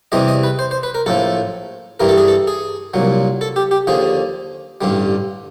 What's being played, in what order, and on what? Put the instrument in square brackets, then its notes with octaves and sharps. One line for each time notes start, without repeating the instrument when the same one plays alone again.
[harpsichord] E2 C3 E3 G3 D#5
D#5
B4
C5
C5
B4
A#4
A#1 A2 F3 A4
G2 E3 G3 A#4
A4
G#4
A4
G#4
C2 A#2 F#3
A4
G4
G4
D#2 D3 F3 G#4
A1 G2 D3 G3